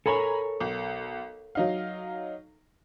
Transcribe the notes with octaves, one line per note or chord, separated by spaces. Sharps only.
A4 A#4 C#5 G#5 A#5 B5
B1
F#3 D#4 F5